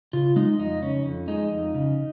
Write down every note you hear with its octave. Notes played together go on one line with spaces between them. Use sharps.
C#3 F4
G#3 D#4
F2 D#4
C#3 C#4
F2
G#3 D#4
F2
C#3